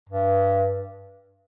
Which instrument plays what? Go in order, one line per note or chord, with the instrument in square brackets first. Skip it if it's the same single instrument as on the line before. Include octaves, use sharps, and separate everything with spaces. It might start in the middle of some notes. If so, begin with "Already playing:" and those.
[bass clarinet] G2